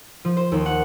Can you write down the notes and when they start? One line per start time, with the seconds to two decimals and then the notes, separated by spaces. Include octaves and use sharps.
0.25 F3
0.37 C5
0.52 D#2
0.66 F#5